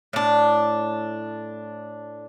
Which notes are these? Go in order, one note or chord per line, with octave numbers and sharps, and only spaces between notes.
A2 D4